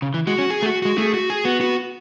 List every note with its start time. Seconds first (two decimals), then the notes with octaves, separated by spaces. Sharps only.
0.02 C#3
0.14 E3
0.27 G#3 F#4
0.38 C#4
0.50 G#4
0.62 A3
0.66 F#4
0.82 G#3 F#4
0.98 A3 G#4
1.14 F#4
1.30 G#4
1.45 B3 F#4
1.61 F#4